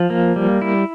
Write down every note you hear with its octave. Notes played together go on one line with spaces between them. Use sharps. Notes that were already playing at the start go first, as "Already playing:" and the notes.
Already playing: F3
A#3
G3
E4